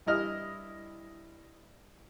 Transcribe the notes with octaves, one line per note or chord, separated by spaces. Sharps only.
G2 E4 D#5 F6